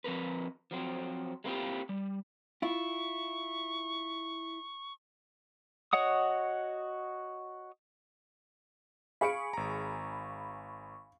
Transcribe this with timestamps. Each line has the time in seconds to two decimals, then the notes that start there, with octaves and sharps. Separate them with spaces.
0.04 F3 C4 A#4 B4
0.71 F3 F#3 C4
1.44 G#3 A#3 C4 E4 F4 G4
1.89 G3
2.62 E4 F4 C#6
5.93 F#4 C#5 D#5 F#5 D#6
9.21 G#4 F5 B5 C#6 C#7 D7
9.53 G#1 A#5